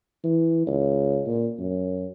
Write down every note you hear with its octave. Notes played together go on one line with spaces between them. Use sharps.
E3
C#2
A#2
F#2